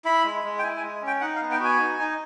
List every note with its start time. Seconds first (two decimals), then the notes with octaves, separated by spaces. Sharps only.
0.05 E4 B5
0.25 G#3
0.44 G#3
0.59 G5
0.63 E4 G#5
0.77 G#5
0.82 G#3
1.02 C#4
1.07 G5
1.21 D#4 F#5
1.36 F5
1.41 B3
1.51 G5
1.60 F#4 G#5
1.79 D#4
1.99 D#4